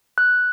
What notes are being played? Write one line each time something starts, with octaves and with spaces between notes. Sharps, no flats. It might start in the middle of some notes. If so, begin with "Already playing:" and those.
F#6